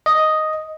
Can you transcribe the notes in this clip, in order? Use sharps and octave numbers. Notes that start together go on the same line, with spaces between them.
D#5